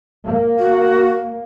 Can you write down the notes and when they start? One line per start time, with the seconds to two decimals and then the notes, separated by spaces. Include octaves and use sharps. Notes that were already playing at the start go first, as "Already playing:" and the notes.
0.25 A#3
0.59 F#4